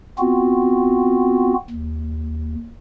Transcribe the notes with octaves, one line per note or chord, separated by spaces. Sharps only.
B3 C4 F4 F#4
D#2